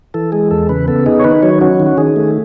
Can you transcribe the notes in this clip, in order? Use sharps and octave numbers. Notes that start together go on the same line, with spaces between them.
E3 A4
G#3 G#4
E2 A4
C#3 B4
B3 A4
D#4 G#4
C#5
D#3 B4
F#3 C#5
C#4 F#4
D#3
F#4
D#3 G#4
A3